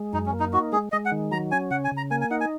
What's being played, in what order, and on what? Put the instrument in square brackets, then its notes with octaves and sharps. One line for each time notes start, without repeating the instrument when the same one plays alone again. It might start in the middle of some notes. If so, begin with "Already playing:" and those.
Already playing: [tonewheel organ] G#3
[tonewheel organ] F#2 [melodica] D#4
[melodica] C#4
[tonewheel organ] A#3
[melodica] D#4
[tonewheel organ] D#4 [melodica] F#4
[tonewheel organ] G#3 [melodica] G#4
[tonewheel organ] G#3 [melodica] D#5
[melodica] F#5
[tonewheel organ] D#3
[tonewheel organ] F#3 [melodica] A#5
[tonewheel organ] C#4 [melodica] G#5
[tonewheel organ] C#3 [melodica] F#5
[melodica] G#5
[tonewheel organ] C#3
[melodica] A#5
[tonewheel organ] A#3 [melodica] G#5
[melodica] G#5
[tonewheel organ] D#4 [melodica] F#5
[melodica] G#5